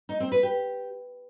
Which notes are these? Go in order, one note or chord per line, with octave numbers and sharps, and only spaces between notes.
D#4
C4
B4
G4